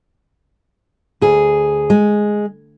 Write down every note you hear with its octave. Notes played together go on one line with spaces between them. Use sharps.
D2 G#4
G#3